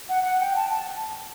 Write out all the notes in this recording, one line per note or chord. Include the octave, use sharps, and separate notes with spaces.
F#5
F#5
G5
A5
A5